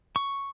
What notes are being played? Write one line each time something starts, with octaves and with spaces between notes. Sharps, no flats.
C#6